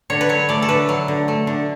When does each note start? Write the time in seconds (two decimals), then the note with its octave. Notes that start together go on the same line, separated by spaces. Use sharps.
0.10 D3 C#5
0.21 B4
0.29 F#3 C#5
0.49 A3 D5
0.62 A4
0.69 D3 B4
0.89 F#3
1.08 D3
1.28 A3
1.47 D3